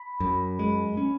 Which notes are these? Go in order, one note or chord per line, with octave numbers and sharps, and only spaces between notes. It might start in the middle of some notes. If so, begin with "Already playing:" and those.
Already playing: B5
F#2
G#3
C#4